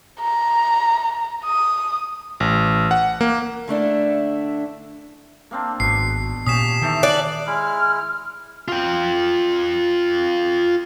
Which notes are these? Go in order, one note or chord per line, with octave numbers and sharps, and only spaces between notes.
A#5
D#6
A1
F#5
A#3
D3 A3 D4 E4
A#3 C4 D4
G#1 B2 C7
A#2 C#4 G4 D#6 B6 E7
D#3 E3 A4 G5
D5 F#6 F#7
G#3 E4 F6
F4 G5